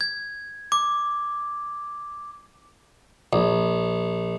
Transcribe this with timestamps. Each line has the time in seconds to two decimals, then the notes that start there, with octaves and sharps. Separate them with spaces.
0.01 G#6
0.72 D6
3.33 A#1